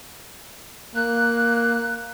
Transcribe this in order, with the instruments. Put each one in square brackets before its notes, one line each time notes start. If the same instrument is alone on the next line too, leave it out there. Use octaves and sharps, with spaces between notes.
[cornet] A#3 [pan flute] F#6